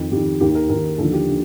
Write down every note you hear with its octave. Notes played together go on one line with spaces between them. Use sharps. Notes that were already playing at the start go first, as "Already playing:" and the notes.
Already playing: F2 D#3
F2 D#3 G4
D#2 D#3 G4
A#4
D#2 D#3 A#4
D#2 D3 F3 A4
G4
D3